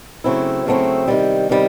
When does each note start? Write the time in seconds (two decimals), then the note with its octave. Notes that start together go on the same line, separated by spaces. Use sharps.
0.24 C#3 F#3 A3 C4 E4
0.66 C#3 F#3 A3 C4 E4
1.08 C3 D#3 G3
1.49 C3 D#3 G3